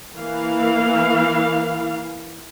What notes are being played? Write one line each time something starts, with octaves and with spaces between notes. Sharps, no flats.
E3 A#3 F5